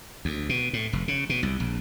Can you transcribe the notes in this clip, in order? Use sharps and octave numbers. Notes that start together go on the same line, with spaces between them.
D2
B2
A2
F1
C#3
B2
C2
A#1